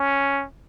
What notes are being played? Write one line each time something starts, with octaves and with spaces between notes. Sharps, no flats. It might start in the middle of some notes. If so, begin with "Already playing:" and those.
Already playing: C#4